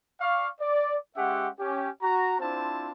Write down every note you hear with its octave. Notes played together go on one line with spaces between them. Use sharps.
D5 F5 C#6
D5
G#3 C#4 G4 E5 F#5
C#4 G4
F#4 A#5
C4 D4 E4 F4 C5 A5